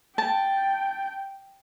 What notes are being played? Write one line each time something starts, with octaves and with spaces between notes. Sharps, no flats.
G5 A5